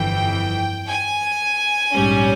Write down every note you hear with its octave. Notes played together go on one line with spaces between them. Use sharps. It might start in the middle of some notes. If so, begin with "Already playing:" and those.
Already playing: G1 F2 E3 G5
G#5
A#1 G#2 G3 C#4